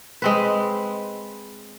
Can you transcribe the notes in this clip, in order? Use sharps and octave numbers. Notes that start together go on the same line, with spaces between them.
G#3 C4 B4